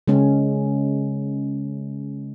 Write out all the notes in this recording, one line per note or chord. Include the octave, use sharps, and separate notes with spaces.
C#3 G#3 C#4